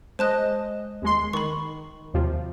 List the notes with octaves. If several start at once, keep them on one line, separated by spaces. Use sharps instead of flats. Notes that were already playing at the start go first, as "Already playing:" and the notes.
G#3 C5 D#5 A5 F#6
D#2 G#3 C6
D#3 B5 C#6
D#2 C3 F3